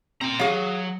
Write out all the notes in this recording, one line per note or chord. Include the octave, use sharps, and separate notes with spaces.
C4 F4 A#5
F#3 G#4 F5